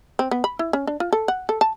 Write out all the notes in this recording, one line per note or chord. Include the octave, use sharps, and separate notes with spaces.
C4
B3
B5
E4
C#4
D4
F4
A4
F#5
A4
A5